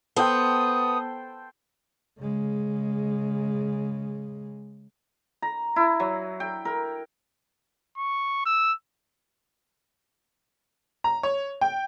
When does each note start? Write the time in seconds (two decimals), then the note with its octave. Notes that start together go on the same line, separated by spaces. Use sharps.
0.16 B3 A4 C5 G5 D#6
2.19 C#3 G#3
5.42 A#5
5.76 E4
6.00 F#3
6.40 G5
6.65 A#4
7.98 C#6
8.46 E6
11.04 A#5
11.23 C#5
11.61 G5